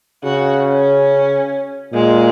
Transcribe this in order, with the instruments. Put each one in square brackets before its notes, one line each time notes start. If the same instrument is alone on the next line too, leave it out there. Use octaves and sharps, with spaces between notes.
[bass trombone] C#3 [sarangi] F#4
[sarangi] C#4
[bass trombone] A#2 [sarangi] G#3